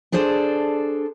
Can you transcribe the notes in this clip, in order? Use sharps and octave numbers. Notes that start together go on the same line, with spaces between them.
D4 G#4 A4 C5 D5